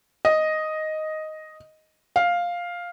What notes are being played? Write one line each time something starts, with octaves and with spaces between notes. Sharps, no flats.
D#5
F5